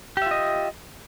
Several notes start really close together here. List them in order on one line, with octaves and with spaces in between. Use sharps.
G4 E5 F4 D#5